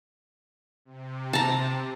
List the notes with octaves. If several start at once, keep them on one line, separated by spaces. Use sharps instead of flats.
C3
A5 A#5